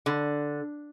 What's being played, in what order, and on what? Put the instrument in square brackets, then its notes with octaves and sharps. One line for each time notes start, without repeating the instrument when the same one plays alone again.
[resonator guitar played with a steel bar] D3